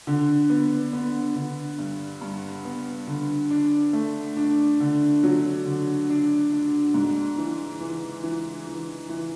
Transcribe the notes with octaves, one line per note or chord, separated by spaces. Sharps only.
D3
B3
B3
D3
G2
G2
B3
D3
D4
A3
D4
D3
F#3
D3
D4
D4
G#2
E3
E3
E3
E3
E3